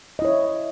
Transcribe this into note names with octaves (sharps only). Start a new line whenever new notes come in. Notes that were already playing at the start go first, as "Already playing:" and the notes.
E4 C#5 D#5